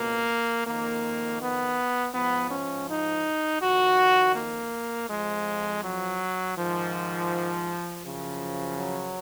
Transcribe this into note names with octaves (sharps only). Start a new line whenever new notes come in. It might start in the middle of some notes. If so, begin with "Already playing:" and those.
Already playing: C#2 B2 A#3
F2 D#3 A#3
B3
G#2 F3 B3
C#4
D#4
F2 D#3 F#4
A#3
F2 F3 G#3
F#3
G#2 D#3 F3
F#2 C#3 F3
F#3